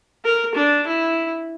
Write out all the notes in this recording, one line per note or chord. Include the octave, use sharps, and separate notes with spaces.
A#4
D4
E4